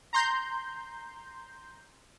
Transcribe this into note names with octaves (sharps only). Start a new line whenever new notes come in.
A#5 C6 G6